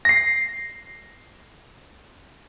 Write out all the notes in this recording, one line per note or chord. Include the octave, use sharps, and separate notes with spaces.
A#6 C7